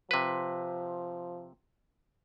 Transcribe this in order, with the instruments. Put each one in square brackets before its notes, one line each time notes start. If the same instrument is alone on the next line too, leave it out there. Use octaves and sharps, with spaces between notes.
[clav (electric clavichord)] C3 B4 [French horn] F3